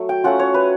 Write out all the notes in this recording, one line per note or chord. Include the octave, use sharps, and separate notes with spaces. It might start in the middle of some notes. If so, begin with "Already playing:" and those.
Already playing: F#3 A3
G5
F#3 A3 C#4 F4 F#5
C#5
B4